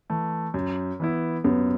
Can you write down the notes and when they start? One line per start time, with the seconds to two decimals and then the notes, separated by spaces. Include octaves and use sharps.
0.10 E3 A3
0.54 F#2
1.00 E3 B3 E4
1.44 F#2 B3